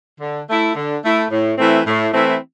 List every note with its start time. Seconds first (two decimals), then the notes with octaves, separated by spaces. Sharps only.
0.20 D3
0.48 A3 E4
0.75 D3
1.03 A3 E4
1.31 A2
1.58 E3 A3 C4 E4
1.86 A2
2.13 E3 A3 C4 E4